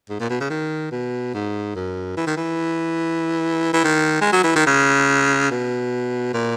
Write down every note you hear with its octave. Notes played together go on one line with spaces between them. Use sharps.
G#2
A#2
B2
C#3
D#3
B2
G#2
F#2
E3
D#3
E3
E3
D#3
G#3
F#3
E3
D#3
C#3
B2
A#2